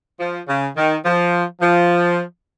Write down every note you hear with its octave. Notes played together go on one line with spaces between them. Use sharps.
F3
C#3
D#3
F3
F3